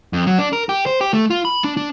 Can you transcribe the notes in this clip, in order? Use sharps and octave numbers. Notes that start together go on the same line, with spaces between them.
F2
F#3
D4
A#4
G4
C5
G4
A3
F4
B5
D4
D4